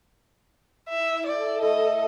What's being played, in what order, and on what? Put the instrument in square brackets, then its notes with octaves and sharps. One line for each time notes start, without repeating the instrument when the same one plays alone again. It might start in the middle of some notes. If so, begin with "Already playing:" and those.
[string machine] E4 [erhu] E5
[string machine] A4 [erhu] D5 [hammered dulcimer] E5 G5
[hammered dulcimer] A2 A3 E4 [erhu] D#5